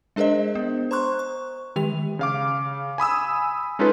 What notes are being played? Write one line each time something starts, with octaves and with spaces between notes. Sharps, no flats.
G#3 D4 G#4 A#4 C5 D#5
B3
C5 A#5 C6 C#6 F#6
C#6
D#3 G#3 G4 F7
C#3 F5 D6
G#5 B5 D#6 E6
G#3 C#4 D#4 F4 A4 B4